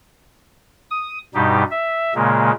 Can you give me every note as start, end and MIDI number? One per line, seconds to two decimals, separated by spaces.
0.90 1.18 87
1.35 1.64 43
1.35 1.64 47
1.35 1.64 55
1.35 1.64 63
1.35 1.64 67
1.71 2.14 76
2.15 2.52 46
2.15 2.52 49
2.15 2.52 56
2.15 2.52 58